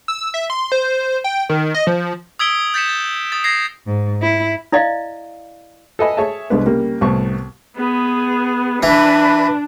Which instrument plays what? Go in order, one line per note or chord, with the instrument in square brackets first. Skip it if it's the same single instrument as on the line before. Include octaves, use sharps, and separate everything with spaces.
[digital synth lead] E6
E5
C6
C5
G5
D#3
D#5
F3
[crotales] D#6 E6 G#6 B6 D7 G7
G6 A6 B6 C#7 E7
A6
D#6 A6
G#6 A#6 C7
[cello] G#2
E4
[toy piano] E4 D5 D#5 F5
[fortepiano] A4 B4 D#5 E5 G#5 B5
G#4 C#5 E5 A5
C2 G#3 B3 D4 B4
C#3 G3 A#3
C2 A2 B3 C#6
[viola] B3 G#4
[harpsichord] E3 [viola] D4 [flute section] B4